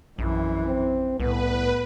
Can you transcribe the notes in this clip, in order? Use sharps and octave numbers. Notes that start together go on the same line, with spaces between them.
A#1 F#2 E3
C4
C2 A2 B3 B4